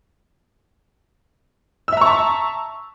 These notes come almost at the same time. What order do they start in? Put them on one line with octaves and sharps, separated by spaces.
E6 E5 A#5 C#6 A5